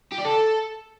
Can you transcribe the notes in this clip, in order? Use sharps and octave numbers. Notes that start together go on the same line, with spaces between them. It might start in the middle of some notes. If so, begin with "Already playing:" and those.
G4
D5
A4